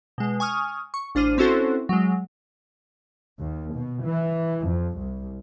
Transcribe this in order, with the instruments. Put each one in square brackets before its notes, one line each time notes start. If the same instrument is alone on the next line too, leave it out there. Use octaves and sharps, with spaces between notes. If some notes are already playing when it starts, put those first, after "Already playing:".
[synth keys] B2 G#3
G#5 C#6 D#6 F6
C#6
A1 D4 C5 F6 D#7
C4 C#4 E4 F#4 A4 C5
F#3 G#3
[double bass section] D#2
B2
E3
F2
C2